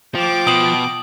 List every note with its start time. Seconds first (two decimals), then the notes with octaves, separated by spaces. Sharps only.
0.15 F3 G5 D6
0.47 B2 D#6 F#7